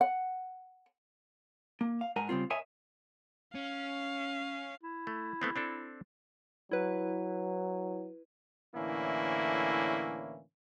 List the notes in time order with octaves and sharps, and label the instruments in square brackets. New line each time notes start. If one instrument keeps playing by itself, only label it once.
[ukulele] F#5
[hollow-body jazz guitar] A#3
F5
G#2 A#4 F#5 G#5 A#5
C#3 G3 C4 F4
A#4 C#5 D#5 E5 G#5
[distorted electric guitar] C#4 [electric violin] F5
[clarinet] E4
[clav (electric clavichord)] A3
A3 B3 C4
C4 D4 A4
[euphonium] F#3 [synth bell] E4 B4
[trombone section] A2 D3 E3 A#3 C#4 E4